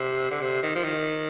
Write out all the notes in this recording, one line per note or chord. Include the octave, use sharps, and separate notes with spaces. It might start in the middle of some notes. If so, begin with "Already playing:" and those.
Already playing: C3
D3
C3
D#3
F3
D#3